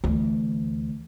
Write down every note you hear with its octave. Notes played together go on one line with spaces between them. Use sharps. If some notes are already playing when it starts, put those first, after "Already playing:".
D2 E3